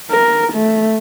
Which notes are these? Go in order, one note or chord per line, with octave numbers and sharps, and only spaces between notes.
A#4
A3